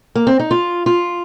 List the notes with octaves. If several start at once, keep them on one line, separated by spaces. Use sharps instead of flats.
A#3
C4
D#4
F4
F4